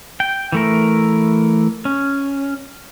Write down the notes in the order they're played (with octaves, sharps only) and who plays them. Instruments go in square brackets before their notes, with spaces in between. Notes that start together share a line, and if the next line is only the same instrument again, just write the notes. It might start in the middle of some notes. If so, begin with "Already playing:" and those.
[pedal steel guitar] G5
E3 A3 A#4
C#4